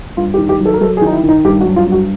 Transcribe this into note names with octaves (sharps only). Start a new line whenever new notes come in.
G2 F4
G4
D#3
G4
F#3
A4
A#4
F#3 A4
G#4
D#3 D#4
E4
D#3
D#4
G2 G4
F#4
F#3
F4
G2
F#4